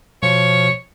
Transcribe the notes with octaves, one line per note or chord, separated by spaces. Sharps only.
B2 F3 C#5